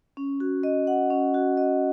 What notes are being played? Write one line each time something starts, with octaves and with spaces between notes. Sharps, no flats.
C#4
F#4
D#5
F#5
C#4
F#4
D#5